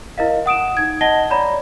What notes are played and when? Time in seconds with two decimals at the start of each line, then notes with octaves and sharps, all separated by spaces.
0.18 E4 A#4 D#5 F5
0.46 F#5 D#6 D7 E7
0.77 D#4 G#6
1.01 D#5 F#5 A5 A#6 G7
1.30 C#5 D5 A#5 B5